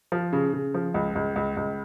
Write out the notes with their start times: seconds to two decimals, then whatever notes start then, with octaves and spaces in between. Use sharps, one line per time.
0.12 F3
0.33 C#3
0.53 C#3
0.74 F3
0.94 C#2
1.15 C#2
1.36 C#2
1.57 C#2